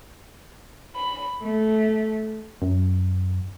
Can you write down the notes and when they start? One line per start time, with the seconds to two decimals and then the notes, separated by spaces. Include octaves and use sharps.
0.96 B5
1.43 A3
2.62 F#2